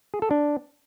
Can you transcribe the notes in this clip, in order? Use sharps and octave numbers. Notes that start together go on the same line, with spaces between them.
G#4
A4
D4